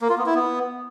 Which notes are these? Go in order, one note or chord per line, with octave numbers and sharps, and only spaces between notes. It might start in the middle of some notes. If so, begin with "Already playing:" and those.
A#3
F4
B3
E4
B3